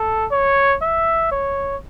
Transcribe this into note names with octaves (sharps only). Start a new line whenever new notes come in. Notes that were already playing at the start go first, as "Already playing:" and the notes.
Already playing: A4
C#5
E5
C#5